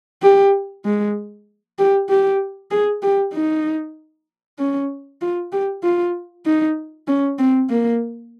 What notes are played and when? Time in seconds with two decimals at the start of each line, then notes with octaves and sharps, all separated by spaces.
0.22 G4
0.85 G#3
1.79 G4
2.09 G4
2.71 G#4
3.03 G4
3.34 D#4
4.59 C#4
5.21 F4
5.52 G4
5.83 F4
6.46 D#4
7.08 C#4
7.39 C4
7.70 A#3